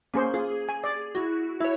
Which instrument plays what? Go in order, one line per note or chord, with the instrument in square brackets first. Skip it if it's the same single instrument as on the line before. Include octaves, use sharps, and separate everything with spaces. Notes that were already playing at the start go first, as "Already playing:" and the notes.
[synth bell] A#3 [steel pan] C#4 G#4 C5
[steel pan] F4 [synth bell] G#4
[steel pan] G#5
D5
[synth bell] E4 F#4
[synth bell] E4 C#5 [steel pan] E5